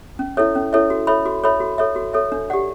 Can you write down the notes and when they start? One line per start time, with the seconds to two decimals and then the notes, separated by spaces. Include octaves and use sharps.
0.19 C#4
0.37 E4 A4 C#5 E5
0.55 C#4
0.73 E4 A4 C#5 E5
0.90 F#4
1.07 A4 C#5 E5 B5
1.26 F#4
1.44 A4 C#5 E5 B5
1.60 F#4
1.78 A4 C#5 E5
1.96 F#4
2.13 A4 C#5 E5
2.32 D4
2.50 G4 D5 F#5